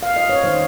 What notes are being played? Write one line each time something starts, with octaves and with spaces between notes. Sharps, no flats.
F5
D#5
C#5
D#3 G#3 D#4 C5